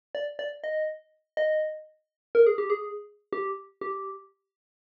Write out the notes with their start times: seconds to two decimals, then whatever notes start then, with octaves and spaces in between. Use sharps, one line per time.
0.15 D5
0.39 D5
0.64 D#5
1.37 D#5
2.35 A#4
2.47 G#4
2.58 G4
2.70 G#4
3.33 G4
3.81 G4